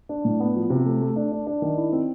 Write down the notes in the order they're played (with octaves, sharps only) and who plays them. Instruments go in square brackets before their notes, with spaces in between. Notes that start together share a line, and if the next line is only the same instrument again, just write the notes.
[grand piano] D4
A2
B3
F3
C3
A3
A3
D4
D4
D4
D#3
E4
C4